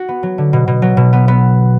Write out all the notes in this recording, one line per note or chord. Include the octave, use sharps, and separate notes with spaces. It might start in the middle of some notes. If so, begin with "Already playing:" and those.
Already playing: F#4
B3
F#3
D3
B2
B2
F#3
B2
B3
B3